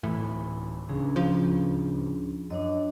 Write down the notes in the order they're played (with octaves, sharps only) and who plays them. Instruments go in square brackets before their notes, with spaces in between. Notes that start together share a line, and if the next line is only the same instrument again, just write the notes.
[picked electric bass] D1 E3 [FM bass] A2
[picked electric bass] D1 C#2 C#3 [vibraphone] C#4 D4 G#4
[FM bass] F3
[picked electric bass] F#2 [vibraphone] D4 C#5 D#5